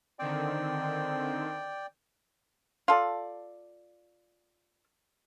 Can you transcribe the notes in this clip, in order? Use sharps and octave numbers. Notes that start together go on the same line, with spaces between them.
D3 D#3 C4 D5 G5
F4 A4 D5